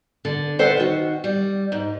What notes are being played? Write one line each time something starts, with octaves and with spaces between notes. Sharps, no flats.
D3
A4 B4 C5 E5 F#5 G5
D#3 F#4
G3
G#2